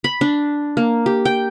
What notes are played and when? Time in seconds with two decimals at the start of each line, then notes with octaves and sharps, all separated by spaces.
0.04 B5
0.21 D4
0.77 A#3
1.06 G4
1.25 G5